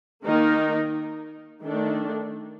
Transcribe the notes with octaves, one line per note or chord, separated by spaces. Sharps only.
D#3 A#3 D#4 A#4
D#3 A3 D4 A4